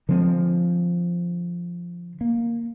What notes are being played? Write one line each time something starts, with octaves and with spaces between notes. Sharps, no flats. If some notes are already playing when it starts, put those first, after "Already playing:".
D3 F3 G#3 C4
A#3